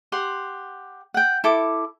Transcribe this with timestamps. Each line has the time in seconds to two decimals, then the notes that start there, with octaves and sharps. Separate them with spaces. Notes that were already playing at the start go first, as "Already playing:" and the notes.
0.12 G4 F#5 C6
1.14 F#5 G5
1.44 E4 A4 D6